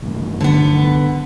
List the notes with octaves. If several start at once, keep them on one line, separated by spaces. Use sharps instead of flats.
B1 G2
D3 B3